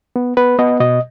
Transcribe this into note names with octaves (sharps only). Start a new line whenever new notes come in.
B3
B3 B4
B3 D#5
B2 D#5